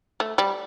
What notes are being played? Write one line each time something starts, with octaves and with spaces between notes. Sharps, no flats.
A3
G3